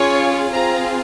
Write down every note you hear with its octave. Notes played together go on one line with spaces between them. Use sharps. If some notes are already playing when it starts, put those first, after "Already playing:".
Already playing: C#4 F4 G#4 C#5
C4 F4 G#4 A#5